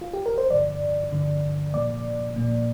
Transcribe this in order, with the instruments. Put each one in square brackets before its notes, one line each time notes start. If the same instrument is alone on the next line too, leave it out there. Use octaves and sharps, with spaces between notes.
[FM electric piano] F4
G4
A#4
C5
[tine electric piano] G2 D3 F3 [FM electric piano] D5
[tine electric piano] G2 D3 F3
[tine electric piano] A#2 F3 A#3 [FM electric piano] D5
[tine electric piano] A#2 F3 A#3